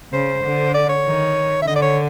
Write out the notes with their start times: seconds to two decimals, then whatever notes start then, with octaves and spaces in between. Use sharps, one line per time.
0.13 C#3 C5
0.44 D3
0.74 D5
0.89 C#5
1.06 D#3
1.62 E5
1.67 D3 D#5
1.76 D5
1.82 C#5